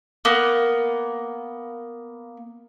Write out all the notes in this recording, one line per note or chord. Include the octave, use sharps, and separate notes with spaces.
A#3 B3